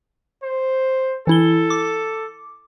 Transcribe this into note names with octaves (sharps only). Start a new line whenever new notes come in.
C5
E3 E4 A4 G7
D6